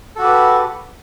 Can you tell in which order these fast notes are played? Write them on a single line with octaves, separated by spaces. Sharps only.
A4 F#4 G4 B4